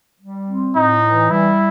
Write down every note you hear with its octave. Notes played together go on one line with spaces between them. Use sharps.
G3
C4
A2 D#4
E3
G3 E4